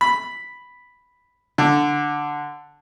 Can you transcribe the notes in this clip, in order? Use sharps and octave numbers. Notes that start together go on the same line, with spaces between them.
B5
D3